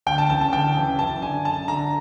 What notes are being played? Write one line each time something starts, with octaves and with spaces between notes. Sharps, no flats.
D2 G5
A5
C#3 E3 A5
A5
D2 G5
C#3 E3
F#2 A5
D3 G#5
F#2 A5
D3 A#5